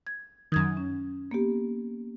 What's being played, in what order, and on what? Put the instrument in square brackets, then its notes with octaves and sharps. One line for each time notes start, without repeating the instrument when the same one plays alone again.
[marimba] G#6
[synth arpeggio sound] F#2 D#3 [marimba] D#6 G#6
[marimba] C#4
A#3 B3 G4